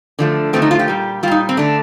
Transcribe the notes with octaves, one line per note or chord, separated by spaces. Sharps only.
D3 F3 A3
D3 F3 A3 C4
D#4
F4
G4
A#2 G3
A#2 G3 D#4 F4
C4
D3 A3 D4